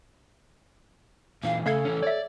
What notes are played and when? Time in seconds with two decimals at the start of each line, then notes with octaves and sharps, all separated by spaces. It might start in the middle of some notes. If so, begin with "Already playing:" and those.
1.44 A#2 E3 F5
1.66 C#3 A3 A4 F5 G#6
1.85 E3 C#4
2.03 C#5 D5 E5